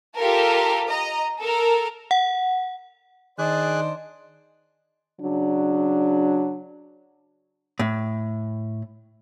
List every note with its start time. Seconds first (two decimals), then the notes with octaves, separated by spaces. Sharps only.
0.18 F4 G4 A4 A#4
0.88 D#5 A#5
1.40 A4 A#4
2.11 F#5
3.39 D#3 D4 G#4 C5 D5 D#5 F#6
5.21 C#3 F#3 D4
7.79 A2